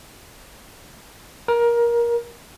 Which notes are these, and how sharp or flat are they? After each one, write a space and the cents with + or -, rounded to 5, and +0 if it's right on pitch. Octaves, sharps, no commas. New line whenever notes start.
A#4 +20